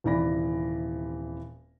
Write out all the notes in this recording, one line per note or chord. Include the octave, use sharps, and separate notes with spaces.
D#1 C3 E3 D5 B5 A#6